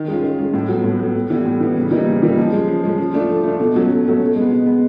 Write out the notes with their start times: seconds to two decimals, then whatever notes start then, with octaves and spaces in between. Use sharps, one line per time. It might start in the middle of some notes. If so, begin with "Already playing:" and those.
Already playing: D#3
0.08 G#3 C#4 F4
0.23 D#3
0.39 G#3 C#4 F4
0.54 A2
0.69 F#3 B3
0.84 A2
0.99 F#3 B3
1.15 A2
1.30 E3 G3 B3
1.46 A2
1.60 E3 G3 B3
1.77 C#3
1.91 E3 G3 A#3 D#4
2.07 C#3
2.22 E3 G3 A#3 D#4
2.37 F3
2.52 G#3 C#4
2.68 F3
2.83 G#3 C#4
2.98 F3
3.14 A3 D4 F4
3.29 F3
3.44 A3 D4 F4
3.60 B2
3.74 F#3 A3 C#4
3.90 B2
4.05 F#3 A3 C#4
4.21 B2
4.36 G#3 B3
4.51 B2
4.66 G#3 B3